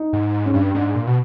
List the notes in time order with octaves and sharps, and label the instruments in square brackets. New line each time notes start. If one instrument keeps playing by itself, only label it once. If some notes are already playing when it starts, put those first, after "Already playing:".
Already playing: [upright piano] D#4
[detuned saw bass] G#2
[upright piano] C#4
[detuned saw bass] G2 [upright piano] D4
[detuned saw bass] G#2 [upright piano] D4
[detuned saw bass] A#2
B2